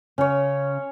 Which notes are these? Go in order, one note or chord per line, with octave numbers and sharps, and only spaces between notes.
C#3 C#4 C#5